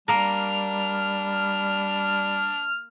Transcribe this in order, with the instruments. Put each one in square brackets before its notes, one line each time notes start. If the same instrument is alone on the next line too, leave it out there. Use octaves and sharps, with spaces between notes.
[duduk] G3 [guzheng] A#3 A#4 [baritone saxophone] D4 [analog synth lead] F6